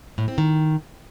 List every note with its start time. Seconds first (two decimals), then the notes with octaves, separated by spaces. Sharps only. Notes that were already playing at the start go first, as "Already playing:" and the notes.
0.18 A2
0.28 C4
0.38 D#3